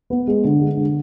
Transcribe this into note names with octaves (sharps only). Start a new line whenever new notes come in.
B3
G#3
D3
G#3
D3